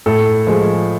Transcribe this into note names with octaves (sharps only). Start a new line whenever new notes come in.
A2 A4
F3 G#3